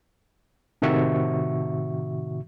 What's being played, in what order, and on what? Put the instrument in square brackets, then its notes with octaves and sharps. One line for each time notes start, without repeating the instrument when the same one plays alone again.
[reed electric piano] A2 C3 D#3 F#4 E5 C#6